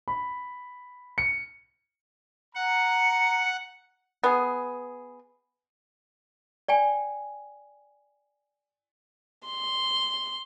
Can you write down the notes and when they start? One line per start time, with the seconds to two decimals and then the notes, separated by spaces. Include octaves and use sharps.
0.08 B5
1.18 C#7
2.55 F#5 A#5 C#7
4.24 B3 G#4
6.68 D5 G5 G#5
9.48 C6